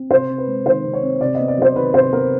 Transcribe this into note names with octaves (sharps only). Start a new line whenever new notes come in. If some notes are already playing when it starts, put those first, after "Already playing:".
Already playing: C4
C3 C5
C4
B4
G#3
D#3 C5
C3
C#5
C4
C3 D5
B3 D#5
D5
F#3 C5
D#3 B4
C3 C5
B3 A#4